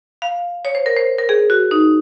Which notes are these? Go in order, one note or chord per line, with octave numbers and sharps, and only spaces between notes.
F5
C#5
C5
A#4
C5
A#4
G#4
F#4
D#4